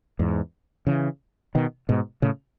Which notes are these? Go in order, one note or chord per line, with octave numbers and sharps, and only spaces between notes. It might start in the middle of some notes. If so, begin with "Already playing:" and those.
E2 G#2
C#3 E3
B2 D#3
G#2 B2
A2 C#3